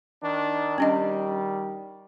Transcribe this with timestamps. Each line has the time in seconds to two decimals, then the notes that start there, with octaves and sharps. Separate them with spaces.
0.21 D#3 D4
0.78 D#3 G3 C#4 D4 D#5